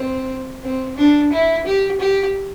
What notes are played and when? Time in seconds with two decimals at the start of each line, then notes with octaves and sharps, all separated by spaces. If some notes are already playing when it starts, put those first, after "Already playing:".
Already playing: C4
0.63 C4
0.97 D4
1.32 E4
1.66 G4
2.00 G4